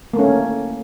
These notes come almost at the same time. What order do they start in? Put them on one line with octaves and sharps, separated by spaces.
A#3 A3 C#4